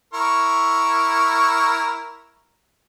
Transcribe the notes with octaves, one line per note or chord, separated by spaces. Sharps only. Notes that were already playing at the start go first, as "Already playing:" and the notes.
E4 A#4 C#6